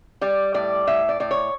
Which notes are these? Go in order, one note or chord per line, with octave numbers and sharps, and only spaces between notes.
G3 D5
A2 D5
A2 E5
D5
A2 D5
C#5